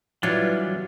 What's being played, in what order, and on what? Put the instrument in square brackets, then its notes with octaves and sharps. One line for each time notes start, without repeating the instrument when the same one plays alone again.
[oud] E3 [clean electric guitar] F#3 G3 [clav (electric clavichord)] D4 F4 C#5